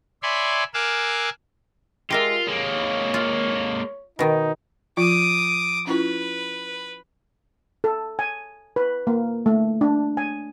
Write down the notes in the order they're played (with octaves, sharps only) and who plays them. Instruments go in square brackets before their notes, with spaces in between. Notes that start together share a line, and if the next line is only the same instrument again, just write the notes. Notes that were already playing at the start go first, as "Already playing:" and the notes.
[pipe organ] C#5 D5 E5 G#5 B5 C6
A#4 F5 G#5 D6 E6 F#6
[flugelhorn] G#3 [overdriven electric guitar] F4 [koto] G4 A#4 E5
[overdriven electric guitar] G#3 A#3 [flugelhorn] C#5
[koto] F4
[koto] B2 D#3 [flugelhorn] D#4
[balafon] F3 F4 [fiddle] D6 D#6
[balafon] C#4 E4 F4 [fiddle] B4
[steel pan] A4
G#5
B4
A#3
A3
D4
G#5